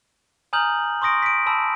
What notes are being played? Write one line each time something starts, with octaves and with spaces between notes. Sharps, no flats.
G#5 A#5 D#6 F6 G6 F#7
C6 C#6 D#6 A#6 D7
B6 D7
A5 B5 E6